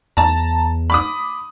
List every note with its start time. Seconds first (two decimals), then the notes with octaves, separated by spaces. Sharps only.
0.17 E2 A5 A#5
0.90 B5 D6 D#6